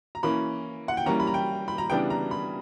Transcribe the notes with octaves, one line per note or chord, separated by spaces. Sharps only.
A#5
E3 A#3 C#4 B5
F#5
G5
E3 G3 A#3 C#4 A#5
B5
A#5
G5
B5
A#5
C#3 E3 G3 B3 D4 G5
A#5
B5